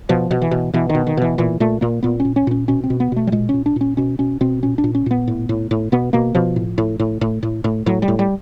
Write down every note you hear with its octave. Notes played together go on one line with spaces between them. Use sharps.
B2 F3
B2
E3
B2
B2 E3
D#3
B2
D#3
B2 E3
A#2 E3
A#2 A3
A#2 A#3
A#2 B3
C#4
A#2
C#4
A#2 C#4
B2 C#4
C4
B2
B3
B2 A3
G3
A#2 G#3
A#2 C#4
D4
A#2 C#4
B2 C#4
B2 C#4
B2 C4
A#2 C#4
D4
A#2
C#4
A#2 B3
A2
A2
A2
B2 B3
B2 A#3
B2 F3
A2
A2
A2
A2
A2
A2
A2 F#3
G3
A2
G3